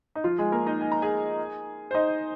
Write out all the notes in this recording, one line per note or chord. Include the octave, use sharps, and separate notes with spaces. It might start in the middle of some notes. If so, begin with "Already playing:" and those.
D#4
F3 F4
G#3 G#4
A#3 A#4
D#4 D#5
G#5
A#5
G#4 G#5
C5
D#4 D#5